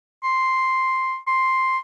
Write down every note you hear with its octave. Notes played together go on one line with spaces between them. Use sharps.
C6
C6